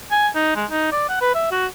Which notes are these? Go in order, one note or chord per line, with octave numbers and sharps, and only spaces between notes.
G#5
D#4
G#3
D#4
D5
F#5
B4
E5
F#4